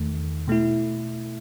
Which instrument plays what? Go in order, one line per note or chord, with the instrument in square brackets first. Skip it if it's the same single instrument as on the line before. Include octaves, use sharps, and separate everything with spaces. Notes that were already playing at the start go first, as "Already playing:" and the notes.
Already playing: [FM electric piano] E2 D#3 A3
B2 A3 E4